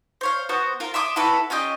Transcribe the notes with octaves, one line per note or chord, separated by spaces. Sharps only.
C5 C#5 F5
B3 F#4 C5
F4 A#4
E5 C6 D6 D#6
E4 F#4 A4 B4
C#4 F4 G4 D#5